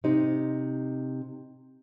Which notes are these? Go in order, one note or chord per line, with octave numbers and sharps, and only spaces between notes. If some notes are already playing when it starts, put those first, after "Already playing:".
C3 D#4